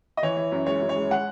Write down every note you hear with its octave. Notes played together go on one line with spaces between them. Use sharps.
D#5
E3 C#5
E3
F#2
G#3 C#5
F#2
C#5
G#3
G#3 F#5